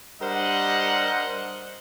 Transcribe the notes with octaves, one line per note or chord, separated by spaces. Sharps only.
G3 D4 A#4 C5 D#5 F#5